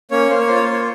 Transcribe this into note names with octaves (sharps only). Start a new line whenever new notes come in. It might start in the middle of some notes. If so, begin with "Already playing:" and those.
A#3 C#4 C#5
A#3 C5
C#5
F4 C5
C#5
C5
A#3 C#5